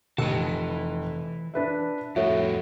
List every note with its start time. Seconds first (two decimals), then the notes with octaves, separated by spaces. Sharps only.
0.18 F1 G4 B4 G5 A5 E6
0.35 E3
1.54 D4 B4 E5
2.16 F2 A2 F#4 A4 C#5 E5